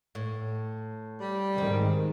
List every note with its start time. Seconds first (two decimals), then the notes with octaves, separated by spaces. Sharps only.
0.15 A2
1.21 G3
1.58 G#2 D#3 C4